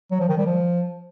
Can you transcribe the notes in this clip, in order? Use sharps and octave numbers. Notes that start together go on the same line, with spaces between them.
F#3
F3
D#3
G3
F3